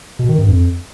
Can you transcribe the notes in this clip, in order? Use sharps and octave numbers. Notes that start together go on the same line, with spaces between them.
B2
D#3
G2
F2